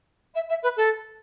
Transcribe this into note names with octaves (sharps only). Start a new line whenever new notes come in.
E5
E5
B4
A4